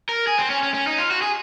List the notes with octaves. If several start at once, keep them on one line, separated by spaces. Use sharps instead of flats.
A#4
G#4
C4
C#4
C#4
C#4
D#4
F4
F#4
G#4